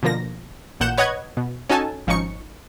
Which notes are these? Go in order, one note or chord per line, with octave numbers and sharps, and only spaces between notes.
B2 D3 F3 A#3 A#6
A1 A#2 F#5 G6 E7
B4 C#5 D#5 F#5 F#6 G#6
B2
C#4 D#4 F#4 A4 G#5 A5
G#1 F3 C#4 D#4 C#6 C#7